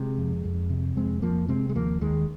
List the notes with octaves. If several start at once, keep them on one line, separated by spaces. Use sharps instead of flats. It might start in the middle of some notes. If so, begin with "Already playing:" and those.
Already playing: C3 G#3 C4
F2
F2
C3
F2 G#3 C4
F2 F3 A#3
C3 G#3 C4
G#3
D#2 F3 A#3
D#2 D#3 G#3